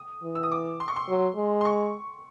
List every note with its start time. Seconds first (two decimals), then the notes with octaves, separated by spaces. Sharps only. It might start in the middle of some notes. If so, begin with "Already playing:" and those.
Already playing: D#6
0.23 E3
0.35 E6
0.43 D#6
0.52 D6
0.80 C6
0.88 C#6
0.96 C6
1.09 F#3
1.36 G#3
1.61 C6
1.65 C#6